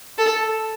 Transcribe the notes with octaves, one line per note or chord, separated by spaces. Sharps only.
A4